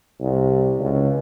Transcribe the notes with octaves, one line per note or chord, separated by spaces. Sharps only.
C2
C#2